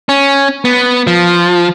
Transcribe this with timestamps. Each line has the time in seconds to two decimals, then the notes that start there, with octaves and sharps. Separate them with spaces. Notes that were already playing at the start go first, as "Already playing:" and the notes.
0.09 C#4
0.65 B3
1.07 F3